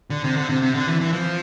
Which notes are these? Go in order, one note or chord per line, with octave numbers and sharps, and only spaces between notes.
D3
C3
D3
C3
C3
D3
E3
E3
F3